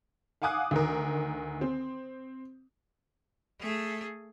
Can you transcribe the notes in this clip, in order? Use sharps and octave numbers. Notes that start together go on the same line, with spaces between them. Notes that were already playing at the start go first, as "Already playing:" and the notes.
F5 F#5 G#5 D6 D#6 F#6
D2 D#3 A#4
C4
A3 G#4